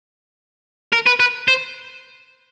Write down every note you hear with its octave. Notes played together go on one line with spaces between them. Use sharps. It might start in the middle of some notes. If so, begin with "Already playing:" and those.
A#4
B4
B4
C5